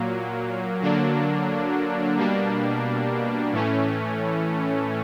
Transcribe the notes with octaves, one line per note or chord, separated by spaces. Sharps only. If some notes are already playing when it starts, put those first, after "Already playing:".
Already playing: A#2 F#3 A#3
D3 F#3 A#3 D4
B2 G3 A#3 D4
A2 E3 A3 C#4